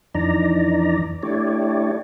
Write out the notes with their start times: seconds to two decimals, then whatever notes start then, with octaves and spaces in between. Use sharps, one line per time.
0.15 F2 E3 D4 D#4 D5 A#5
1.23 A3 D4 E4 G4 C#5 D5